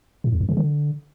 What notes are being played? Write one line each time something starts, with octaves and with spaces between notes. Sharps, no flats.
A2
E2
F2
C#3
D3